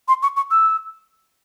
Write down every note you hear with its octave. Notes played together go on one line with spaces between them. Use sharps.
C6
C#6
C#6
E6